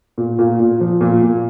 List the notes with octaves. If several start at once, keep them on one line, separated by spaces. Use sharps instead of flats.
A#2
A#2
A#2
F3
A#2
A#2